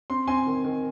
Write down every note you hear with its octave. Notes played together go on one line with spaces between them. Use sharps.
C4 C6
C4 G#5 C6
D#3
D#3